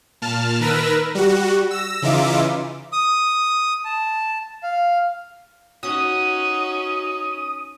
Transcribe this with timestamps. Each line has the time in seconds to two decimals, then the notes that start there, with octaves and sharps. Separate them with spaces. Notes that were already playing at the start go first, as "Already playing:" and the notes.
0.22 A#2 A5 F6
0.60 D#3 A#4 B4 E6 A#6
1.15 G3 F#4
1.71 E6 A#6
2.02 C#3 E3 D#4 F4 E5 D6
2.93 D#6
3.85 A5
4.63 F5
5.83 C#4 D#4 F#4 D#6